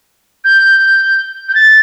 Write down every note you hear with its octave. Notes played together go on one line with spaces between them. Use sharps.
G6
G6
A6